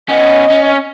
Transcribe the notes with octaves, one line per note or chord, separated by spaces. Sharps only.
B3 C#4 D#5
C#4